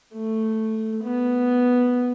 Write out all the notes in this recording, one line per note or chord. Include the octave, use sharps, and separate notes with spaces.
A3
B3